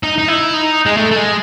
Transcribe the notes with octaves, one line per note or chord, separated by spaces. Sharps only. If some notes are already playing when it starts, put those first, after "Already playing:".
D#4
D#4
E4
D#4
G#3
A3
A3
G#3